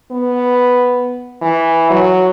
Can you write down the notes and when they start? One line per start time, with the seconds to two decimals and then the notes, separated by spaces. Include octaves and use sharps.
0.12 B3
1.42 E3
1.90 F#3